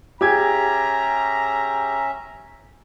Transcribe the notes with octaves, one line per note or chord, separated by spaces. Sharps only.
C#4 G4 G#4 E5 A#5 G#6